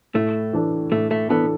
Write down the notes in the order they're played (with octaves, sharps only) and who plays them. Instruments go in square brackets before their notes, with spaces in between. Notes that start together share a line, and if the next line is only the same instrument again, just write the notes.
[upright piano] A2 [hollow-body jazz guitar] A3
[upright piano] E3 D4 A4
[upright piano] A2 [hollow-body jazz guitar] A3
[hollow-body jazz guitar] A3
[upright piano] E3 D4 A4 [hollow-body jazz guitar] B3